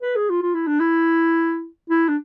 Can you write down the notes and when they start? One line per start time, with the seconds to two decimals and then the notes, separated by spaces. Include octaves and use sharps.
0.02 B4
0.16 G#4
0.30 F4
0.42 F4
0.55 E4
0.67 D4
0.80 E4
1.90 E4
2.08 D4